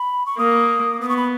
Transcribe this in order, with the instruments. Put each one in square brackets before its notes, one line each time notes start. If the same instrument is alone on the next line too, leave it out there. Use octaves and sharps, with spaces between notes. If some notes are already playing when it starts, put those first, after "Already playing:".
Already playing: [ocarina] B5
C#6
[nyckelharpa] A#3 [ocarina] D#6
[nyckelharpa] B3 [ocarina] D#6
[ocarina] C#6
B5